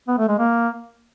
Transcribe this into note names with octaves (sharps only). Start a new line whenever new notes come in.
B3
A3
G#3
A#3